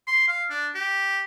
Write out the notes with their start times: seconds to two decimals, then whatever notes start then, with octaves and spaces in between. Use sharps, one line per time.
0.07 C6
0.28 F5
0.50 D4
0.75 G4